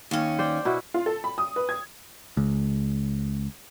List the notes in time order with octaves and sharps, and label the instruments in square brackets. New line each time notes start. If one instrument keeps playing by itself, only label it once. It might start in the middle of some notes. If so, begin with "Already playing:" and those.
[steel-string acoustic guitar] D#2 C#4
[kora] C5 D5 G5
B2 E4 F#4
[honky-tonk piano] F4
A4
B5
D#6
B4
G#6
[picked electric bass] C#2